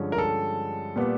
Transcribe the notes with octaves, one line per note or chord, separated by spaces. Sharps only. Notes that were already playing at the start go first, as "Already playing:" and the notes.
Already playing: G2 D3 F3 G#3 C#4
A#4
A4
A#2 G3 B3